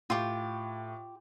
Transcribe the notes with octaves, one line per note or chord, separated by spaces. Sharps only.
A2 F4 G4